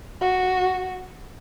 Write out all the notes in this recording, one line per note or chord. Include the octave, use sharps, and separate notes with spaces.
F#4